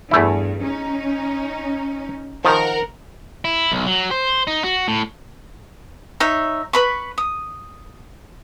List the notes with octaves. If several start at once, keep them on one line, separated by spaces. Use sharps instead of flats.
E2 G2 A3 E4
C#4 D#4
D#3 F3 A#4 F#5
E4
B1
F#3
C5
D#4
F#4
A2
D#4 C#5 E5
B4 B5 C#6
D#6